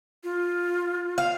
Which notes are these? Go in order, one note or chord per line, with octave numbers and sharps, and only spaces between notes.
F4
F5